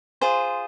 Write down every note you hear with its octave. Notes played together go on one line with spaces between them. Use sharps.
F4 G#4 C5